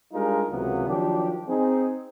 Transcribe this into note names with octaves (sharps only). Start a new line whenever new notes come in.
G3 G#3 D4 D#4 F4 A#4
C#2 C3 E3 F#3 A#3 B3
D#3 F3 F#3 D4 G4
C4 D#4 G#4